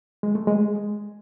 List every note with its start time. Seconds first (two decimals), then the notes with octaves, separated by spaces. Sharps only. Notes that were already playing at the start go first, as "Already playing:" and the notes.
0.23 G#3
0.35 A3
0.47 G#3